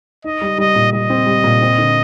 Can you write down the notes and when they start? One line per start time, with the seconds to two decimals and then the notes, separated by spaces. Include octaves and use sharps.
0.24 D#4 D#5
0.42 G3
0.58 G3 D#5
0.75 A#2
0.92 G3 D#5
1.10 C4
1.27 G3
1.44 A#2
1.61 C4
1.78 D3